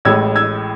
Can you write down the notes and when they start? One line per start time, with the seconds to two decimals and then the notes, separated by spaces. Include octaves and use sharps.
0.05 A1 A2 G#3 E6 G#6
0.36 E6 G#6